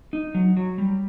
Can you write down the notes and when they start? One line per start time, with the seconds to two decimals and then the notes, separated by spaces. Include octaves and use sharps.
0.13 D#4
0.35 F#3
0.57 F#3
0.78 G3